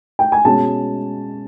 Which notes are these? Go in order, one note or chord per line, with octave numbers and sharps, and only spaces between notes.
G5
G#5
B2 G#3 C#4 A5